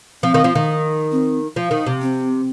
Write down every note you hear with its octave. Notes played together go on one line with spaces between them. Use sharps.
F3 C4
D#3
F3
D#3
C4
F3
D#3
C3
C4